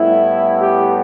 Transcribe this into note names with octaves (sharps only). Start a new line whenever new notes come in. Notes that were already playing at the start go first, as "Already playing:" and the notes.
Already playing: A2 G3 B3 E4
G4